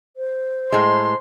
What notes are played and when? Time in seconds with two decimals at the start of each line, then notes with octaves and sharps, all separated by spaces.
0.17 C5
0.72 A2 G#3 C6